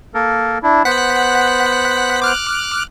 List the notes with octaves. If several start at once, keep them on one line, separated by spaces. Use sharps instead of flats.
A#3 A4 A#4
D4 E4
B3 C5 F#5 F#6 B6
D6 F6 F#6